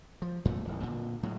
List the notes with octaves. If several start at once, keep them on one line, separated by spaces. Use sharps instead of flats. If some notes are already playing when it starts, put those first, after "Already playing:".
F3
F2 A#2 F3 A3
D1 A1
A#2 D3
A2 F#3 G#3